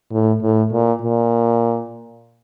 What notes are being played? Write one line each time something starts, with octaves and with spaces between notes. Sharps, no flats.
A2
A2
A#2
A#2